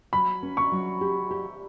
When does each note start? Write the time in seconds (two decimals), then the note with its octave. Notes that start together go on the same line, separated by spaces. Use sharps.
0.13 F#3 B5
0.43 C#4
0.57 C#6
0.72 F#3
1.01 G4
1.31 G4